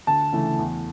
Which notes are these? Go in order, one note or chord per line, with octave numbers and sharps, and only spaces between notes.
D2 A5
C#3 E3 A3
E2